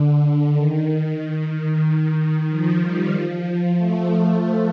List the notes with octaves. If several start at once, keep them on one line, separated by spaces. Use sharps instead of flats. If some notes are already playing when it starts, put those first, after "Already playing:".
Already playing: D3
D#3
D#3
F3
G3
F3
A3